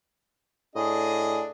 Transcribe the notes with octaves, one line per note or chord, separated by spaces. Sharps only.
A2 D4 G#4 D#5